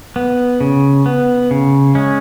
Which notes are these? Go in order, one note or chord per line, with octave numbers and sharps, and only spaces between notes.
B3
C#3
B3
C#3
G#3 C#4